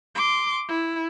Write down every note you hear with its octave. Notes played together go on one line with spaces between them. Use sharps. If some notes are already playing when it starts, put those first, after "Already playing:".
C6 D6
E4